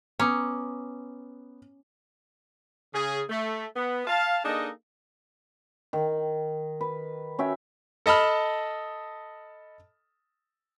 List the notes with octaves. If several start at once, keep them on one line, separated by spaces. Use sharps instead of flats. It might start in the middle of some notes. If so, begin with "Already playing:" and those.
B3 C#4 A#5 D6 D#6
C#3 G#4
A3
B3
F5 A5
A#3 D4 D#4 G#4 A4 D#5
D#3
B4
C#4 F#4 E5 G5
A4 D#5 A5 B5 F6